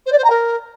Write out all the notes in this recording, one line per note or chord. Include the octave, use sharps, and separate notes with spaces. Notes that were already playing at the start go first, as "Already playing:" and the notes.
C5
D5
C5
A#5
A#4